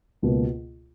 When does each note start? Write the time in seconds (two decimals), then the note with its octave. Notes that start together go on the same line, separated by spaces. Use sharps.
0.22 C#2 B2 A#3